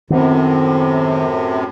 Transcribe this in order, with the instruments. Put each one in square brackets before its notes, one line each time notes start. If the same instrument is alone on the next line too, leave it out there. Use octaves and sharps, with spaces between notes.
[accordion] F#2 A2 C3 [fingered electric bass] D#3 B3 C4